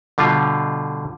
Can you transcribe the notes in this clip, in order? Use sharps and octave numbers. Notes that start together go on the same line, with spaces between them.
B2 D3 G3 F4